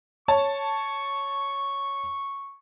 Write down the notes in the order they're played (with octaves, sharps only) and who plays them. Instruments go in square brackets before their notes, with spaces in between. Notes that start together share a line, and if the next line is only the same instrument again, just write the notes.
[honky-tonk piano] C#5 A5 [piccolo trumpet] C#6